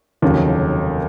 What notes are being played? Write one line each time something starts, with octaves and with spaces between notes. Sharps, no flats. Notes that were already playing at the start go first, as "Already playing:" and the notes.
F1 D#2 C#3 F#3